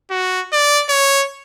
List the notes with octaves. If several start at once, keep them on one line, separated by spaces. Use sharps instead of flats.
F#4
D5
C#5